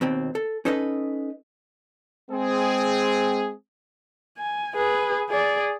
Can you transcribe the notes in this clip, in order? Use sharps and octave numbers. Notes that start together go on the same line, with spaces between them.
D#2 B2 C4
A4
C#4 D#4 A4 B4 D#5
G#3 C4 G#4
G#5
G#4 B4
G#4 D5